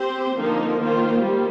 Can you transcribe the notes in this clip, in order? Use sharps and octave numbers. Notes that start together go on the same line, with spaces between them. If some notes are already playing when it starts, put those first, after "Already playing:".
Already playing: C4 G4 C5
D3 F3 A#3 D#4 A#4
D#3 A#3 F4 C5
G3 A#3